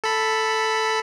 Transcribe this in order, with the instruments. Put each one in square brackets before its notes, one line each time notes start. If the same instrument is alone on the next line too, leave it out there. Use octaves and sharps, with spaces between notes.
[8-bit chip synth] A4 B5